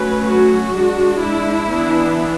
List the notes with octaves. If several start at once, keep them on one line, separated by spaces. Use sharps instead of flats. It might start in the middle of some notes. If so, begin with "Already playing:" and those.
Already playing: F#3 A3 C#4 B4
F#4
G#3 D4
E4
E3 B3 D4